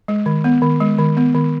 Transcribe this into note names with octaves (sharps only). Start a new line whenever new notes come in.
G#3
D#3
B3
D#3
G#3
D#3
B3
D#3